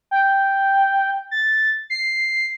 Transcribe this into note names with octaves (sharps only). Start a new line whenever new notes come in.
G5
A6
C7